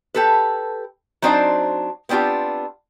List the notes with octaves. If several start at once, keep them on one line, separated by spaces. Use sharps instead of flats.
G4 A4 B4
F#3 C4 D4 D#4 C5 D5
B3 C4 D4 F4 G4